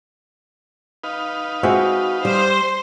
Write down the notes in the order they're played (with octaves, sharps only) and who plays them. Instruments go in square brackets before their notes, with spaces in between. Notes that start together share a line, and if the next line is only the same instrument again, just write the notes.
[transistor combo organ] D#4 B4 F5
[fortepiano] G#3 C4 E5 [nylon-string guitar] F#4
[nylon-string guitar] G3 [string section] C5